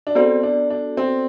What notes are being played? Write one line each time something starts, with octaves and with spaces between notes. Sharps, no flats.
D4
B3 C4 F#4 A4 D5
D4
D4
C4